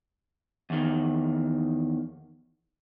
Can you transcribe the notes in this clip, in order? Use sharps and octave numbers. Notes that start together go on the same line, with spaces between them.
E2 D#3